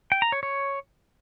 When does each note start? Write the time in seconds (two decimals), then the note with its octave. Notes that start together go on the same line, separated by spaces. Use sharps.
0.12 G5
0.22 A#5
0.32 C#5
0.43 C#5